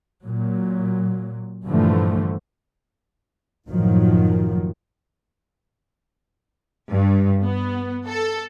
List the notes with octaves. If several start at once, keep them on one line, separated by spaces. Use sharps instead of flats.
A#2 F#3
G2 A#2 D3 E3 F3 A3
F#1 A2 D#3 F3 F#3
G2
B3
A4